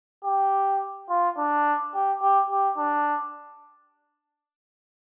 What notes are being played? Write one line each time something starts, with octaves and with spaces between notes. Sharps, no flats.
G4
F4
D4
G4
G4
G4
D4